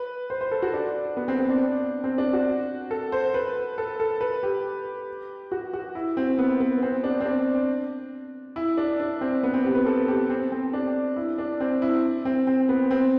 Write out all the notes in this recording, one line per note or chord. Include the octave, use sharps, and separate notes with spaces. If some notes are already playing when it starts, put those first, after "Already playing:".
Already playing: B4
C5
C5
A4
F#4
D4
B3
C4
C4
D4
C4
D4
F#4
A4
C5
B4
A4
A4
B4
G4
F#4
F#4
E4
C4
B3
B3
C4
D4
C4
D4
E4
D4
D4
C4
B3
C4
G4
B4
A4
G4
C4
C4
D4
E4
D4
C4
E4
C4
C4
B3
C4